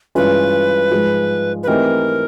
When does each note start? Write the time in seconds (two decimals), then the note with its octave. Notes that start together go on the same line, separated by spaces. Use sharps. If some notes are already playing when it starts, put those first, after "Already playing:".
0.15 G2 E3 G#3 C#4 F4 B4
0.91 G#2 F3 G#3
1.63 B4
1.67 E3 A3 C4 D#4 G4 A#4